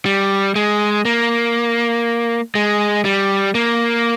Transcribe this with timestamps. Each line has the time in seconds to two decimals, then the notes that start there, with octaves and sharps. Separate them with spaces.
0.06 G3
0.56 G#3
1.05 A#3
2.55 G#3
3.05 G3
3.55 A#3